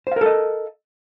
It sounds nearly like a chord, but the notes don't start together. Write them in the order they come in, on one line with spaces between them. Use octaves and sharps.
C5 F5 A#4 A4 D#5